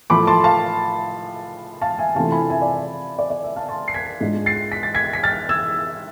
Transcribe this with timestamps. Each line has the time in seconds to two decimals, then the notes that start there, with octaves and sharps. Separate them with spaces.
0.10 A2 F3 A3 B5 D6
0.27 A5 C6
0.44 F5 A5
1.81 F5 A5
1.99 E5 G#5
2.15 C3 E3 A3 D4 F4 F5 A5
2.32 G#5 B5
2.50 E5 G#5
2.62 D5
2.67 E5
3.19 D5
3.30 D5
3.44 E5
3.56 F5 A5
3.69 A5 C6
3.88 C7
3.94 G#6 B6
4.20 G#2 G#3 D4 F4
4.46 A6 C7
4.72 B6
4.83 A6
4.94 G#6 B6
5.13 B6
5.23 F6 A6
5.49 E6 G#6